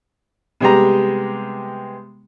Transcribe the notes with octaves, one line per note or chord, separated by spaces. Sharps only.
C3 G3 G#3 B3 G4 A#5